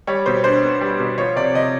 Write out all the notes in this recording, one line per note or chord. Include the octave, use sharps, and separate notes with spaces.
G3 C#5
B2 C5
D4 C5
B3
G3
B2
F3 C#5
C3 D5
C3 D#5